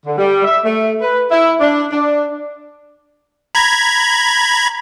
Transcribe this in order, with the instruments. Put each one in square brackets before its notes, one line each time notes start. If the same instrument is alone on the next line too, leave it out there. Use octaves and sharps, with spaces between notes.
[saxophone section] D3
G3
E5
A3
B4
E4
D4
D4
[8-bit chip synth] A#5 B5 G#6